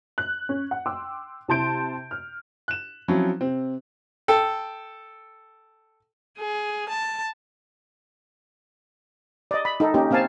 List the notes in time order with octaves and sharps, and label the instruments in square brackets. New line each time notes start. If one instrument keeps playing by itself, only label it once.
[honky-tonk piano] F#6
C#4
F#5
G5 C6 D6 E6
C3 E4 A5 C6 G6 D7
F6
[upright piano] F#6 E7
F3 F#3 C4 C#4 E4
C3 C4
[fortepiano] A4 G5
[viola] G#4
A5
[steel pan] D5 D#5
B5
D#4 A4
A#3 C#4 D#4 G4
A#3 C4 F5 G#5 A5